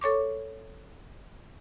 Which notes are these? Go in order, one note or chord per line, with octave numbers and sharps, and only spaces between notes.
A4 C#5 C#6 D6